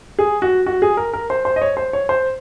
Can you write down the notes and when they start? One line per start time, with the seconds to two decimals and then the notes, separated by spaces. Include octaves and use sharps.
0.19 G#4
0.42 F#4
0.66 F#4
0.82 G#4
0.97 A#4
1.13 A#4
1.30 C5
1.45 C5
1.56 D#5
1.62 C#5
1.77 C5
1.93 C#5
2.09 C5